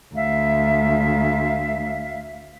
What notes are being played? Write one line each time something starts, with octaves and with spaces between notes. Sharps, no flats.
D2 E5 F5